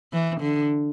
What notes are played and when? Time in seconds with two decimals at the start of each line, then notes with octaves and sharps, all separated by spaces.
0.13 E3
0.41 D3